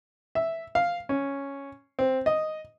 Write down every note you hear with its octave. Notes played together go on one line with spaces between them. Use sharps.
E5
F5
C#4
C4
D#5